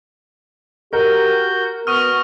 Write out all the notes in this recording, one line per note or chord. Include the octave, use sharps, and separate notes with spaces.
F#4 G4 A#4 G6
B3 F#4 C#6 D#6 F6